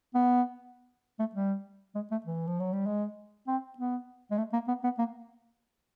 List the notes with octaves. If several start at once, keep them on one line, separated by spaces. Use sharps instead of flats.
B3
A3
G3
G#3
A3
E3
F3
F#3
G3
G#3
C4
B3
G#3
A3
A#3
B3
B3
A#3